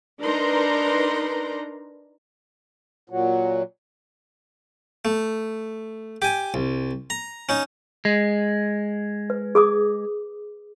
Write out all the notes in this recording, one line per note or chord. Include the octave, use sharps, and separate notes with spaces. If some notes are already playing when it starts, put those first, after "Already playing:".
D4 D#4 A#4 B4 A#5 C6
A#2 F#3
A3
G4 G#5
C2
A#5
C#4 D#4
G#3
B4
G#4 D6 D#6